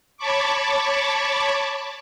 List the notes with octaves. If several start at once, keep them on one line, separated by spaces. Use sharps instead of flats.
C#5 A5 B5 C#6 D6